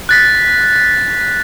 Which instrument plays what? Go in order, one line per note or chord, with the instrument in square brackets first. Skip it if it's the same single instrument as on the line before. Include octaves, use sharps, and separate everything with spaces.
[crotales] F#6 A6 B6